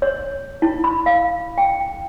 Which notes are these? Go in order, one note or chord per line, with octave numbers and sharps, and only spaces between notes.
C#5
E4
B5
F5
G5